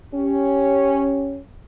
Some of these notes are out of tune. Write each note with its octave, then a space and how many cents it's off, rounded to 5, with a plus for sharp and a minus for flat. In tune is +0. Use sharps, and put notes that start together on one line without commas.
C#4 +0 G4 +0